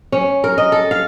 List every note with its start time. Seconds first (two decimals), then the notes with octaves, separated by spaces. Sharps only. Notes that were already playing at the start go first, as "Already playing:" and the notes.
0.12 C#4
0.44 A#4
0.58 D#5
0.72 A4
0.91 F5